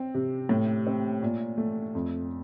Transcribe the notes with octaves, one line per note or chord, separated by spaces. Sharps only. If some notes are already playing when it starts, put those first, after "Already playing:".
Already playing: C4
C3
A2
C4
A#2
A3
F2